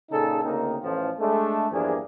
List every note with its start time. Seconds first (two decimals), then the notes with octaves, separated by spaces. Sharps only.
0.11 A#2 C#3 D#4 G#4 A4
0.43 D2 C#3 A#3 C4 D#4
0.82 A1 F3
1.20 G#3 A3 D4
1.72 E2 G2 F3 A#3 D4 G#4